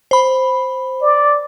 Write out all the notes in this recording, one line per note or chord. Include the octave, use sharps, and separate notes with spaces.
C5 B5
D5